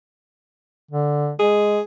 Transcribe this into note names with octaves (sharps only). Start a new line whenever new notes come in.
D3
G#3 G#4